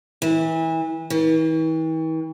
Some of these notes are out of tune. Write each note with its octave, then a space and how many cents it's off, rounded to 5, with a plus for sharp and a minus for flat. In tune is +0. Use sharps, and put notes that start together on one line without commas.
E3 -25
E3 -45